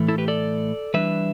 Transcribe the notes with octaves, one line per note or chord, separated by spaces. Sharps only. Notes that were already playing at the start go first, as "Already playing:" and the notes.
Already playing: A2 E3 A3
E4 A4
G4 B4
A4 D5
E3 G3 D4 B4 E5